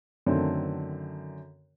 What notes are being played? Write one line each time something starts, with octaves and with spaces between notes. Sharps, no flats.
F#2 D3 D#3 A3 C4